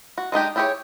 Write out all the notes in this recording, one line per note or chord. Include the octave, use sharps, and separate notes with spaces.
F#4
G#3 D4 D#4 G4
D4 E4 G4 G#4 C#5